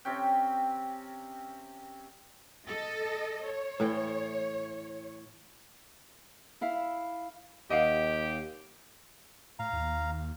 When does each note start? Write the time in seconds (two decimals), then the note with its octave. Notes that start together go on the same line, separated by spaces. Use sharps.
0.05 C3 C4 C#4 G5
2.67 A4 D#5
3.45 C#5
3.80 A2 E3 G5
6.61 E4 E5 F5
7.70 D#2 G4 D#5 F5 F#5
9.59 A2 F5 A#5
9.73 D#2